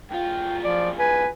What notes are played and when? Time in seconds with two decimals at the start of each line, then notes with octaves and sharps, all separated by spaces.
0.11 B1 F4 G5
0.64 F3 D5
0.99 B4 G#5